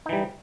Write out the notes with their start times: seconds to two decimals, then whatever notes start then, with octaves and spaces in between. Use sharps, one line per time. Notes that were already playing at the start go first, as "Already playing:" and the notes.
0.06 D#4
0.09 E3
0.13 G3